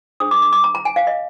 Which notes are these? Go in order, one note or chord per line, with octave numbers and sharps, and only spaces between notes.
D4 G#4 C5 D#6
D6
D6
D6
A#5
A#5
G#5
F5
D#5